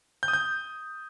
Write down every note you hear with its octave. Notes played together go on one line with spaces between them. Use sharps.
G6
D#6
G6